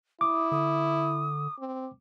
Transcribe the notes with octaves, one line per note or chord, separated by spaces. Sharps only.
E4 D6 D#6
D3 D#6
C4